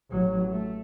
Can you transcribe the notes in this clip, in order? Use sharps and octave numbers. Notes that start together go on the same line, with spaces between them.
A1 F#3
A3